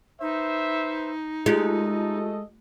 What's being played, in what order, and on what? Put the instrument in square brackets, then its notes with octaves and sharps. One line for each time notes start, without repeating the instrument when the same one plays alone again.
[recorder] D#4 [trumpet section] B4 C5 E5
[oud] G#3 [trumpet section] A3 A4 D#5 [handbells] F4 G4